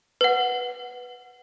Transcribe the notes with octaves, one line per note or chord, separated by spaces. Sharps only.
B4 F#5